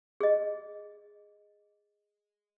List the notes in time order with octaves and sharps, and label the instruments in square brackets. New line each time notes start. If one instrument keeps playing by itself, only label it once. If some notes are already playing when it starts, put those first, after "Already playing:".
[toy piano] G#4 D#5